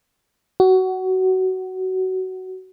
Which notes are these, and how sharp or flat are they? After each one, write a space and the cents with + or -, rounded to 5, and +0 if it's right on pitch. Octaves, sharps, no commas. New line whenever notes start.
F#4 +20